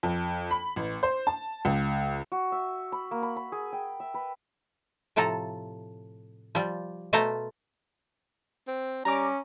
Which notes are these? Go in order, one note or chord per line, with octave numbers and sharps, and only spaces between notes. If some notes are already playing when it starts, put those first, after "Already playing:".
F2
B5
A1
C5
A5
C#2
F#4
E5
B5
A#3
B5
B5
G#4
G5
E5
B4
A2 C3 F3 A4 A#5
F3 G3
B2 A3 C5 F5 A#5
C4
G3 C#4 A#5 D6